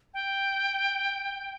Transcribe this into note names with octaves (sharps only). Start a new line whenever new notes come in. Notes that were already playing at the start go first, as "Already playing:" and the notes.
G5